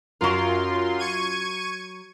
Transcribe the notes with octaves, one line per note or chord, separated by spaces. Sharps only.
F#2 F#3 F4 A#4 C6
C#6 G#6 D#7